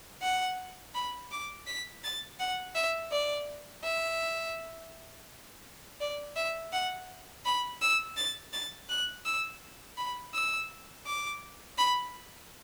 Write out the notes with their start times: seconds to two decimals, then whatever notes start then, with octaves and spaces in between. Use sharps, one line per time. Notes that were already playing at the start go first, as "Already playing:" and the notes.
0.22 F#5
0.95 B5
1.31 D6
1.67 B6
2.03 A6
2.39 F#5
2.75 E5
3.11 D5
3.84 E5
6.00 D5
6.36 E5
6.72 F#5
7.45 B5
7.81 E6
8.17 A6
8.53 A6
8.89 F#6
9.25 E6
9.97 B5
10.34 E6
11.06 D6
11.78 B5